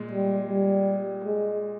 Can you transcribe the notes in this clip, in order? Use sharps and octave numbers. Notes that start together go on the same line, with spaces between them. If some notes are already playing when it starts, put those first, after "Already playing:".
Already playing: A#2 G#3
G3
G3
G#3